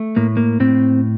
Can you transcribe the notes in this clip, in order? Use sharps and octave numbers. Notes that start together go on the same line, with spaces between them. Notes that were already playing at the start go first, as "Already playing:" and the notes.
Already playing: A3
A2 A#3
A#3
A2 C4